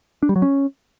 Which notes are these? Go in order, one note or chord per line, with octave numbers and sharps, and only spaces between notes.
D4
G3
F#3
C#4